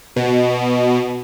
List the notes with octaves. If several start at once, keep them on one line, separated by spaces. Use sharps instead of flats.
B2